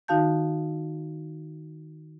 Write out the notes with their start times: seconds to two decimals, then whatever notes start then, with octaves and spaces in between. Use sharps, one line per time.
0.08 D#3 D#4 F#4 F5 A5 G6